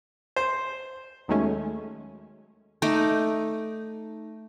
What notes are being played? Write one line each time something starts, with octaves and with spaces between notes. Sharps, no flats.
C5
D#2 D#3 F#3 G#3 A3 C#4
A3 D#4 D6